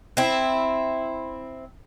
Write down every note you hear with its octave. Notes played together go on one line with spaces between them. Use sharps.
C4 E4